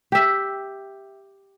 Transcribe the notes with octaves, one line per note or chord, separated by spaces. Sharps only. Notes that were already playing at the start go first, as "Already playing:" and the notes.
G4 E5